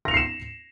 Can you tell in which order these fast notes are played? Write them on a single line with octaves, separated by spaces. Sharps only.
A#6 F7 C#7 C7 E7